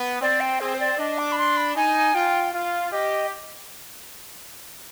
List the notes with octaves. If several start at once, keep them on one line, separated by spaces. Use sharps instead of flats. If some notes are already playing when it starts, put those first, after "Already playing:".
Already playing: B3
C4 D5
G5
C4 G#4
C5
D5
D4 D#5
D6
B5
C6
B5
D#4 G#5
F4 G5
F4 F5
G4 D#5